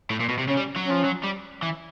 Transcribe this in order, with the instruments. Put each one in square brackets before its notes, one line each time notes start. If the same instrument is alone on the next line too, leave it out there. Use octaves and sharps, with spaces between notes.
[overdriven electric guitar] A2
A#2
B2
C3
[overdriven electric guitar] C#3 [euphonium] C#4
[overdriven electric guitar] G3
F#3
[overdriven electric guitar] F3 [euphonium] C#4
[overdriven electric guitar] F#3
G3
E3